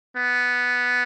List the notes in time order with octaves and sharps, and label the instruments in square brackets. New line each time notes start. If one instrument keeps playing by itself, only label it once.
[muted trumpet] B3